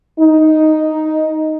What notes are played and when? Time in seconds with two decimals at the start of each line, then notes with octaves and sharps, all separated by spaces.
0.19 D#4